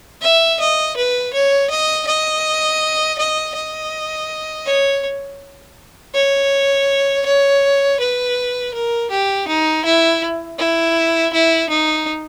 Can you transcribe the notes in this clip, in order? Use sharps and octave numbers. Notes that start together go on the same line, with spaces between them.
E5
D#5
B4
C#5
D#5
D#5
D#5
D#5
C#5
C#5
C#5
B4
A#4
G4
D#4
E4
E4
E4
D#4